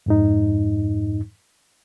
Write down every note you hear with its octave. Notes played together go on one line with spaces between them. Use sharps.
F2 G#2 D#4